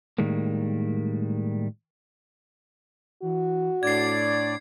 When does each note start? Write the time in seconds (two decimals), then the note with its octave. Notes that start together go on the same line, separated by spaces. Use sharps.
0.18 A2 D#3 G3 G#3 A#3
3.22 E3 F#4
3.83 A2 D4 D5 G#6 C7